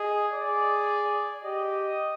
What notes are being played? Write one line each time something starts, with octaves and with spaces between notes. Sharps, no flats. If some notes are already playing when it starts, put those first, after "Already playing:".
Already playing: G#4 D#5
G#4 D5
G4 D#5